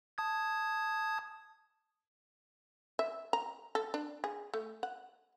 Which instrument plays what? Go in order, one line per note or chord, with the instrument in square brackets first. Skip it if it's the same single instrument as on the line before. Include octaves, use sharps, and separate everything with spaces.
[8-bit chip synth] A5 D#6 G#6
[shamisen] E5
A#5
A4
D4
G#4
A3
F#5